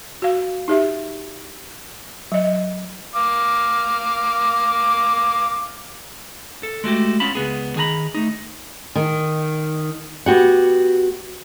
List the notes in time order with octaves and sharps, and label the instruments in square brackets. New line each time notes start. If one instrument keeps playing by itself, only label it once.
[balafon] F#4 F5
D#4 G4 E5
F#3 D#5
[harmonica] F5 D6
[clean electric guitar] A4
G#3 A3 F#4 G4
B3 C#4 F4 A5 B5
C#2 B3 G#4
D#3 G#4 G#5 A#5 B5
A3 D#4
[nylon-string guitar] D#3
B3 F#4 G4 F#5